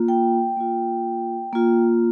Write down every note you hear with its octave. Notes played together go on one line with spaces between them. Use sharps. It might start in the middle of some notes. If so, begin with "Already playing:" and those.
Already playing: A#3 F4
G5
A#3 F4
A#3 F4